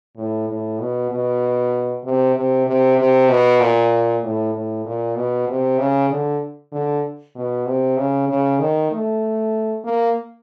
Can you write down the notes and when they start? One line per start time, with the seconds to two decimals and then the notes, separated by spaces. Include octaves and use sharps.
0.17 A2
0.49 A2
0.80 B2
1.11 B2
2.05 C3
2.36 C3
2.67 C3
2.98 C3
3.29 B2
3.61 A#2
4.23 A2
4.54 A2
4.85 A#2
5.16 B2
5.48 C3
5.79 C#3
6.10 D3
6.72 D3
7.35 B2
7.66 C3
7.97 C#3
8.29 C#3
8.59 D#3
8.91 A3
9.84 A#3